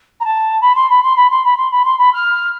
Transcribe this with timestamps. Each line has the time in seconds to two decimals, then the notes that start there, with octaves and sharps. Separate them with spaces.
0.20 A#5
0.24 A5
0.61 B5
0.75 C6
0.89 B5
1.02 C6
1.16 B5
1.30 C6
1.44 B5
1.57 C6
1.71 B5
1.85 C6
1.98 B5
2.13 F6